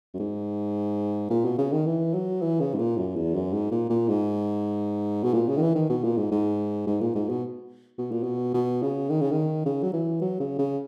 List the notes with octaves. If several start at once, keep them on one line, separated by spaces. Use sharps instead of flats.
F#2
G#2
A#2
B2
C#3
D#3
E3
F#3
E3
C#3
G#2
A#2
F#2
E2
F#2
G#2
A#2
A#2
G#2
B2
A#2
C#3
D#3
E3
D#3
B2
A#2
G#2
G#2
G#2
A#2
G#2
B2
B2
A#2
B2
B2
C#3
D#3
C#3
D#3
C#3
F#3
E3
F#3
C#3
C#3